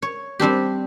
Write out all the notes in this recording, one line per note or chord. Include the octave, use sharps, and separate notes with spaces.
C#5
G3 C4 D4 G4